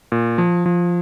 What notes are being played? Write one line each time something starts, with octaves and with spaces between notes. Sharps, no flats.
A#2
F3
F3